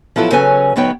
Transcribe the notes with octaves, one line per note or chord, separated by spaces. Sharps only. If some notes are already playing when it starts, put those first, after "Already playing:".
F3 F#3 B3 E4 F4 A4
C#3 F#3 C#4 A4 B4 G#5
D2 F#3 B3 D#4 C#5 G5